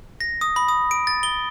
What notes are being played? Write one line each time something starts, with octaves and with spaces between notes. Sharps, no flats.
A#6
D#6
B5
D#6
D7
A6
G7